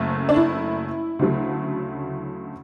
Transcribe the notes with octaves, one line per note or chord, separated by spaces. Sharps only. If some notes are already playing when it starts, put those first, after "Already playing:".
Already playing: F#1 F#2 A3
D4
E4
D2 C#3 F#3 A3